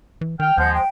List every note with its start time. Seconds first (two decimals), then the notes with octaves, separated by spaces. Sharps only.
0.21 E3
0.40 D#3 G5 F6
0.58 D#2 F3 G#3 F#5 G6
0.75 G5